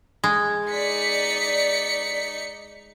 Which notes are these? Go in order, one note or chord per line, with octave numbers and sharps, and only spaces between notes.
G#3
D#4 D5 B6 C#7